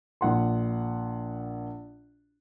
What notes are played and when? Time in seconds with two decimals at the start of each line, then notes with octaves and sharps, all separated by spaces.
0.21 A#1 F#5 C6